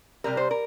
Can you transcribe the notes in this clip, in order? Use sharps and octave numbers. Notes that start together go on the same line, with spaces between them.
C3 G3 A#4
C5
A#4